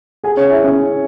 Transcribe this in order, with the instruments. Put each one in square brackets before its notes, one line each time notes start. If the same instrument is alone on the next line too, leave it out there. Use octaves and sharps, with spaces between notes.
[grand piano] G#4 G#5
C#4 C#5
E4 E5
C#4 C#5